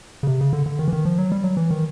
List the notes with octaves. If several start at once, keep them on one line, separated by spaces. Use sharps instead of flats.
C#3
C3
C#3
D3
D3
D#3
E3
D#3
F3
F#3
G3
F#3
E3
D#3